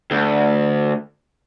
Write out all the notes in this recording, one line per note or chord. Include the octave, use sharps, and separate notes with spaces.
D2